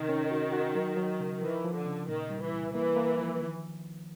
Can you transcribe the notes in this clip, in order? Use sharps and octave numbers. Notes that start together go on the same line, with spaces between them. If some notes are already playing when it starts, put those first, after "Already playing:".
Already playing: C3 D#3
C#4
F#4
F#4
F#3
F#3
C#3
E3 F3
F3
D3
C#3
A#2 D#3
G3
E3
C2
E3 A#3
A#3
F3
D#3